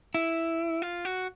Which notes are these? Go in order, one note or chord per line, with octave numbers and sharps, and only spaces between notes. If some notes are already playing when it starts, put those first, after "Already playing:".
E4
F4
F#4